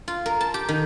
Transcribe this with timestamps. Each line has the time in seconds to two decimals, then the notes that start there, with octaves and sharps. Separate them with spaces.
0.08 F4
0.26 A#4
0.41 A5
0.54 G4
0.69 D#3